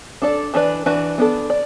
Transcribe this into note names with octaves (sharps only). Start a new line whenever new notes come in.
D4 A4 D5
E3 D4 B4 D5
E3 D4 F#4 B4
B3 D4 A4
D5